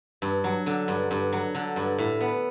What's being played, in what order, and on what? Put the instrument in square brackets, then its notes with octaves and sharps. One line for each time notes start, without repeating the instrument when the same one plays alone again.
[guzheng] G2
F#3
D3
G2
G2
F#3
D3
G2
A2
B3